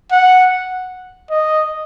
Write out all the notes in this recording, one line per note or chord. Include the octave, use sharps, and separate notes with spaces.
F#5
D#5